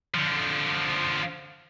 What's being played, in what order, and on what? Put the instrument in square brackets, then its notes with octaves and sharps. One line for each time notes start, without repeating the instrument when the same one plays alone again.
[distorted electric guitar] D3 F3